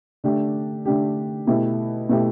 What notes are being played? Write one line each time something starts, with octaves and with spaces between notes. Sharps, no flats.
D3 A3 D4 G4
D3 A3 D4 G4
B2 A3 E4 G4
B2 A3 E4 G4